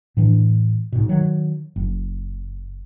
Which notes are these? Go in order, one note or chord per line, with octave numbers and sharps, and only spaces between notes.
A2 E3 D4
G#2 B2
D#3 F#3
F#1